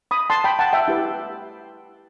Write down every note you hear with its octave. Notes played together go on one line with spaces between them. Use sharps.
B5 D#6
A5 C6
G5 B5
F#5 A5
E5 G5
E4 G4 B4